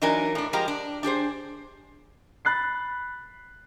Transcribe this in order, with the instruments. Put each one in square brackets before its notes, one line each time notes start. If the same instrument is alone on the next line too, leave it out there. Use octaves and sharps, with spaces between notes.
[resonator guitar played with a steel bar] E3 F#3 D4 D#4 A#4 G#5
A2 D4
F3 G#3 G4 A#4 A#5
D4
D4 G4 G#4 C5
[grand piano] B5 F#6 A6 C7